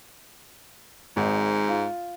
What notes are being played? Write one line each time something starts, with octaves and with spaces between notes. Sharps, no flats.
G#1 G#2
F4